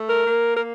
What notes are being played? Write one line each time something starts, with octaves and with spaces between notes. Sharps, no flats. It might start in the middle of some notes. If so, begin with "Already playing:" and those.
Already playing: A3
A#4
A#3
A#4